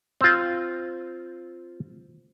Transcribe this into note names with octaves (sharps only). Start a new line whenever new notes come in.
C4 F4